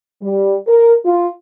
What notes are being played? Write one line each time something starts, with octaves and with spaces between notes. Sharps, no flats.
G3
A#4
F4